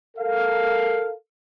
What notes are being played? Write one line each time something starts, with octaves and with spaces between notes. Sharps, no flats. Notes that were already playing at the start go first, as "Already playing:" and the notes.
A4 A#4 F5